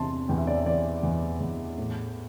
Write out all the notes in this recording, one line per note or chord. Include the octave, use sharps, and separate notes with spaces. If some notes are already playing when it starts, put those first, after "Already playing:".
Already playing: E2 C3 A5 C6
E2 G5
E5
D5
E5
E3 D5
E2
E2
A2